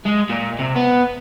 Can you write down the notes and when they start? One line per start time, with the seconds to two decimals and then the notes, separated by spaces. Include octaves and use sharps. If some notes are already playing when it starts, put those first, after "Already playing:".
0.06 G#3
0.30 A#2
0.59 C3
0.76 B3